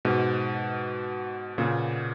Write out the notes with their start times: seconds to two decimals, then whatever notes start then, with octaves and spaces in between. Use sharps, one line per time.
0.05 G#2 B2
1.58 A#2 C#3